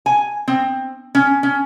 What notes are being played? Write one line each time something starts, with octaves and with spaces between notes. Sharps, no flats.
G#5
C4
C#4
C#4